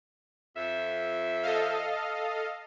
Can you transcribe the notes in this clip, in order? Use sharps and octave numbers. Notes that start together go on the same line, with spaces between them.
F2 E5
A4 D#5 F5